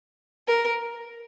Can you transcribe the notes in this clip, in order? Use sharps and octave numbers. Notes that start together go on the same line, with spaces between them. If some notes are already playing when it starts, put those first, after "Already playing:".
A#4